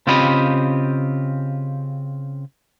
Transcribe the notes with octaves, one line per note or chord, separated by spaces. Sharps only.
C#3 C4 F4 G4 D#5 B5